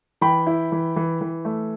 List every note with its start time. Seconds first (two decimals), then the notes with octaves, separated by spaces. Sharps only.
0.21 E3 G5 B5
0.47 E4
0.72 E3
0.96 E3
1.21 E3
1.45 A3